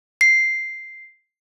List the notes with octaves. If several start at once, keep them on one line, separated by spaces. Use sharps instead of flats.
C7